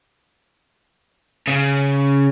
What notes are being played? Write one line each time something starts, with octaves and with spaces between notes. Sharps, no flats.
C#3